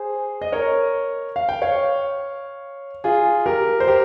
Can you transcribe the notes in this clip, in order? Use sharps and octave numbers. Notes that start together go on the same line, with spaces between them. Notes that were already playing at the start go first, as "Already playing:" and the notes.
Already playing: G#4 C5
D#5
A#4 C#5
F5
G5
C#5 F5
F4 G#4
G4 A#4
C5
G4 A#4